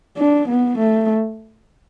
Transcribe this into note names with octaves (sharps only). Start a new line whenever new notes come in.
D4
B3
A3